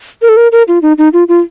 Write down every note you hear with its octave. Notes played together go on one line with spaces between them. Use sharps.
A#4
A4
A#4
A#4
F4
D#4
D#4
F4
F4